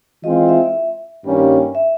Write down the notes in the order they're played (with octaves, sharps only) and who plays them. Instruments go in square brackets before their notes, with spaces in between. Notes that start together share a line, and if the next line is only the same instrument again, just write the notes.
[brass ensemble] E3 G#3 C4 F4 [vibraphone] D#5
[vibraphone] E5
[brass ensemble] G2 D#3 G3 A#3 C#4
[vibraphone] E5